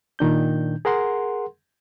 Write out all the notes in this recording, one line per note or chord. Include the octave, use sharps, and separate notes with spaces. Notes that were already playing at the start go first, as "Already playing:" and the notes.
A#2 D#3 D4 G6
G#4 A#4 F#5 C6